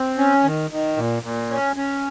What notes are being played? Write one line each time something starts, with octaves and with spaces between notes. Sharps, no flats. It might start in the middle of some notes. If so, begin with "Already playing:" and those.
Already playing: C4
C#4
D#3
D#3
A#2
A#2
C#4
C#4